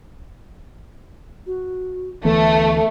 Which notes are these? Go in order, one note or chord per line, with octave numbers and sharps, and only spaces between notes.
F#4
D2 E3 A3 B3 A4